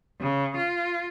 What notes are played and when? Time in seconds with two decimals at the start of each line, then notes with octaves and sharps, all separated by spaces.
0.20 C#3
0.56 F4